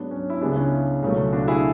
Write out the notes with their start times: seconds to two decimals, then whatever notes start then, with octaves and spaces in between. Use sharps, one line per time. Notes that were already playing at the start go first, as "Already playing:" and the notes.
Already playing: G#2 F#3 B3 D4
0.11 C#4
0.30 E4
0.41 C#2 C#3 G#3 B3 D4
0.56 C#4 E4
1.02 C#2 B2 F#3 A3
1.32 D4 F#4
1.48 E4 G#4